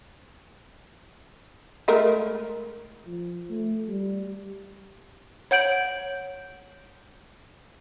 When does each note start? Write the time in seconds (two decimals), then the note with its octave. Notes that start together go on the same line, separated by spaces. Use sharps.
1.88 G#3 A3 A#4
3.07 F3
3.50 A3
3.88 G3
5.51 C#5 F#5 G6 D7 F#7